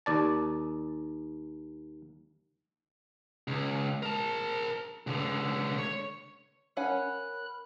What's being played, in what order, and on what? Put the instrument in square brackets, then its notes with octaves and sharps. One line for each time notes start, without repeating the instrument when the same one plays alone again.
[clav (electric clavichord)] D#2 D5 A5
[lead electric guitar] C#2
A#4 A5
C#2 D3
C#5
[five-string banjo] C#4 F#5 G#5 [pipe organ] A#4 B5 F#6